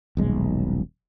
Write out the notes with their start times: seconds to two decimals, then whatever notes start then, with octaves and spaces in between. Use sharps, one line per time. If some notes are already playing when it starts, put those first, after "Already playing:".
0.17 D#1 B1 G#3